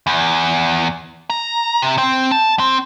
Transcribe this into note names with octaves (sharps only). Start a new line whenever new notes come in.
E2
A#5
C3
C4
A5
C4